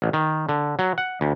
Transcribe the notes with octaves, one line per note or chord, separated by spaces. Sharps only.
A1
D#3
D3
F#3
F#5
D2